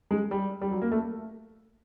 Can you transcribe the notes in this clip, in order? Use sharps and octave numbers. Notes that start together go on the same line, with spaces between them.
G#3
G3
G3
F#3
A#3
A3